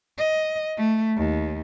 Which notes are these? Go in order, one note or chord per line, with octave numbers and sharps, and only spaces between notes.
D#5
A3
D#2